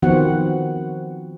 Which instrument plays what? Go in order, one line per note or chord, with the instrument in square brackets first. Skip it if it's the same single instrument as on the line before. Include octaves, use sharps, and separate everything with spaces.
[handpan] D#3 F3 B3 C4 F#4 F#5